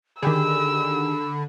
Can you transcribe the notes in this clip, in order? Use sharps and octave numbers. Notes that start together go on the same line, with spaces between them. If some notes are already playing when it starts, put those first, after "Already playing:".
D3 D#3 G4 G#4 B5 E6